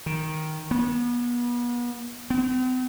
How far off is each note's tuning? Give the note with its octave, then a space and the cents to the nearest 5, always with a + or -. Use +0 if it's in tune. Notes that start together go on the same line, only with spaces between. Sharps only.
D#3 +5
B3 -35
C4 -45